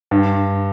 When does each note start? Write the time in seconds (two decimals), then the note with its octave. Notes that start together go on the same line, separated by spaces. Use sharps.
0.11 G2